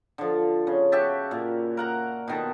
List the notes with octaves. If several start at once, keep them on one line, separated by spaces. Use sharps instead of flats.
D3 F3
C#3
F#4 G4 E5 A5
A#2
A#4 F#5 A#5
B2 D#3 A5